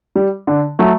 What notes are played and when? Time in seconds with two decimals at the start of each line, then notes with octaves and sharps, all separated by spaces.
0.15 G3
0.47 D3
0.79 F#3 A3